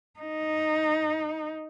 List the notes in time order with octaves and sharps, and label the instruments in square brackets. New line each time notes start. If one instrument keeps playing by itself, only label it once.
[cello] D#4